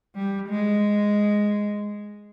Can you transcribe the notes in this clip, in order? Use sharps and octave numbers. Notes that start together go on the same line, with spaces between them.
G3
G#3